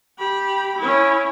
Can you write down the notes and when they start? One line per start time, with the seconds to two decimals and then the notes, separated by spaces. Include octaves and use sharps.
0.18 G4 B5
0.79 C#4 E4